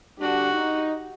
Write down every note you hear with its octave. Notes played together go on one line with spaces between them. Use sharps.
D3 G3 D4 F#4 G4
D#4